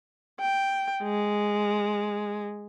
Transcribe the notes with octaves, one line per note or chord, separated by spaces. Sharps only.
G5
G#3